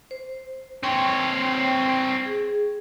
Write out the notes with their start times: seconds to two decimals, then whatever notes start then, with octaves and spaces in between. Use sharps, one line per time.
0.11 C5
0.83 C4 C#5 G5 C6
2.26 G#4